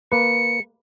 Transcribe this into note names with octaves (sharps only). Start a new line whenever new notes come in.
A#3 B4 C#7